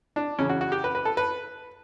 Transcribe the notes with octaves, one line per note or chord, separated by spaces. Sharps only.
D4
E2 C#3 E3 C#4
F#4
F#4
G4
B4
B4
A4
B4